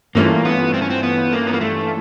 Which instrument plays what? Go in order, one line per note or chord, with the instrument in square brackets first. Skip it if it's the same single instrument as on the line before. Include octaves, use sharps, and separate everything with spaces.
[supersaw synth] G2 E3 A3 C#4 F4 [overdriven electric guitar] A#3
[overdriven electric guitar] B3
C4
C#4
C4
B3
A#3
B3
A#3
A3